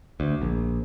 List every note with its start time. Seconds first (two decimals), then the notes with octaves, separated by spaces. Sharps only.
0.20 D2
0.42 A#1